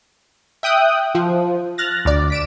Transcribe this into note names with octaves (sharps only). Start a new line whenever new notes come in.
E5 G5 D#6 F#6
F3
F6 F#6 A6 A#6
D2 D5
B6 D7 E7